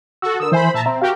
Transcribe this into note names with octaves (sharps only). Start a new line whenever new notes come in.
F#4 A4 E6
D3 A#4 D#6 E6
E3 C5 E5 G#5 B5
A#2 E5 A5 A#5
C4 E5 A#5
F#4 G4 A#4 F5